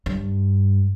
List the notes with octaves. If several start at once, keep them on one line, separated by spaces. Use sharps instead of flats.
G2